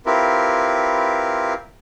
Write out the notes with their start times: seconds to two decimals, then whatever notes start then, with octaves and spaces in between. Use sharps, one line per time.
0.06 C4 E4 F4 G4 A#4 B4